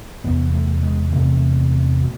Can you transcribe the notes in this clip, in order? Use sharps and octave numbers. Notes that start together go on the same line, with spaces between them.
E2 C3 B3
A3
G#3
E2 C3 A3
B2